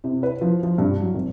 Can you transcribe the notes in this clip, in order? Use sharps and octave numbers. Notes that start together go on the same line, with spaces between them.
C3
B4
F3
F3
G2
F#3
G#1